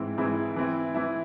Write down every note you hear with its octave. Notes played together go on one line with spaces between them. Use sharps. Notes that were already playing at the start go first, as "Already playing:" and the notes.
Already playing: G#2 E3 C4 E4
G#2 E3 C4 E4
E3 C4 E4
E3 C4 E4